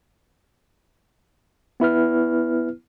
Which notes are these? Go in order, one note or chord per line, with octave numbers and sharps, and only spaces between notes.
B3 E4 B4 F6